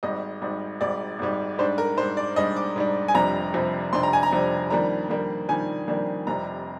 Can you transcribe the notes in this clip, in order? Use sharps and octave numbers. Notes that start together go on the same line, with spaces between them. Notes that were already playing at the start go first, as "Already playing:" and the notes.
G#1 G#2 G3 D#5
G#1 G#2 G3
G#1 G#2 G3 D5
G#1 G#2 G3
G#2 G3 D4 C5
A#4
G#2 G3 D4 C5
D5
G#2 G3 D4 D#5
D6
G#2 G3 D4
G#5
F1 F2 C3 G3 D4 A#5
F1 F2 C3 G3 D4
F1 F2 C3 G3 D4 C6
A#5
G#5
A#5
F1 F2 C3 G3 D4
F2 D#3 G3 A#3 D4 A#5
F2 D#3 G3 A#3 D4
F2 D#3 G3 A#3 D4 G#5
F2 D#3 G3 A#3 D4
F1 F2 C3 G3 A#5